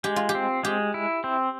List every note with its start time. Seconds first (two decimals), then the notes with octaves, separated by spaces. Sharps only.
0.04 G#3 G4
0.16 F4
0.29 G4
0.35 C4
0.63 G#3 G4
0.94 E4
1.24 C4